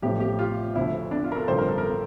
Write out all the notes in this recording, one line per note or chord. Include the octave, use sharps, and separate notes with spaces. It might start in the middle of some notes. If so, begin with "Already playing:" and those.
A1 A2 F3 G4
G4
F4
D2 D3 F3 E4
D4
F4
A#4
A4
A1 G2 D3 F3 C5
A#4
A4
A#4